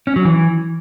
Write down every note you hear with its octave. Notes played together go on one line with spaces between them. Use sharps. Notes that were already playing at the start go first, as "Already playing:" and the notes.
C#4
F#3
E3